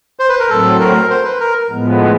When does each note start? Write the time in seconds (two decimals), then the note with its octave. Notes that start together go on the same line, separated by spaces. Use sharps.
0.19 C5
0.29 B4
0.39 A#4
0.50 A2 F#3 A3 C4 A4
0.80 A#4
1.10 C5
1.25 B4
1.40 A#4
1.70 A2 F3 G#3 B3